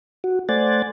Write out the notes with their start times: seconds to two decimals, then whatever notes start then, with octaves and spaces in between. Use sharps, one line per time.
0.24 F#4
0.49 A3 C5 D5 F#5 G#5 A6